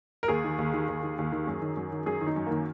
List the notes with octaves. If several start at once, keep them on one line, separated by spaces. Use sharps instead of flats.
A#4
D#2 G#4
D#3
D#2
D#3
D#2
D#3
D#2
D#3
F#2
D#3
F#2
D#3
F#2 G#4
D#3
D#4
F#2
D#3 A#3